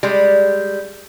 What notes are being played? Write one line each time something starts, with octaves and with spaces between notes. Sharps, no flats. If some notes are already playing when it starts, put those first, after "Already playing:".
G3 G#3